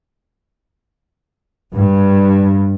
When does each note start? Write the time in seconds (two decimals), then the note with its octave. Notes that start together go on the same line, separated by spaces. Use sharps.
1.75 G2